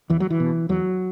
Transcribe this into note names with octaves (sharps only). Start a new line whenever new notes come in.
E2 E3
F#3
E3
B2
E2 F#3